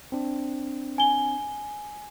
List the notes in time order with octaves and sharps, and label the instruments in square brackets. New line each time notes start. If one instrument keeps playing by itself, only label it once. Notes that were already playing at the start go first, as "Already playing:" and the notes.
[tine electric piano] C4 D4
[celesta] G#5 G7